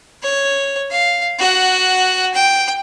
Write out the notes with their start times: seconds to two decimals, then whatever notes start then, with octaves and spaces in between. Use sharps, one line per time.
0.22 C#5
0.90 F5
1.39 F#4 F#5
2.34 G5